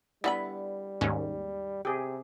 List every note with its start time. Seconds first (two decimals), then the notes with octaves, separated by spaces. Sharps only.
0.24 D3 G3 B3 E4 B5
1.01 D#2 G#2 C#4
1.85 C3 G4 G#4